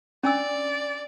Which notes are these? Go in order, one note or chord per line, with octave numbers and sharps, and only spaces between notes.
C#4 D4 D5 E6